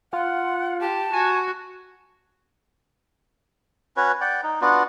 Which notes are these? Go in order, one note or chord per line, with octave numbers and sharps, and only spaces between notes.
F4 F#5
G4 A5
F#4 G#5
C#4 F#4 B4 C#5
D5 F#5 G5
D#4
B3 D4 F4 F#4